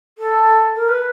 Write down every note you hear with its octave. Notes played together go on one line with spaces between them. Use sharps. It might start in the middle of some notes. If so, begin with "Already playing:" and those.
A4
A#4
B4